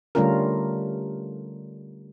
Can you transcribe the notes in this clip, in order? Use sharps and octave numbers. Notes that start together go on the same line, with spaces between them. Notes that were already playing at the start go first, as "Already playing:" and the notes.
D3 G3 A3 C#4 F4 A#4